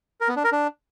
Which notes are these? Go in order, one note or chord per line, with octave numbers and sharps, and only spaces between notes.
A#4
B3
D4
A#4
D4